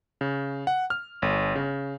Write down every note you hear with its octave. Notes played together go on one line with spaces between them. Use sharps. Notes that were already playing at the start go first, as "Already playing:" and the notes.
C#3
F#5
F6
G1
C#3